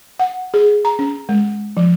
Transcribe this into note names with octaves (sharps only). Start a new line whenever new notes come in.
F#5
G#4
A#5
C#4
G#3
F3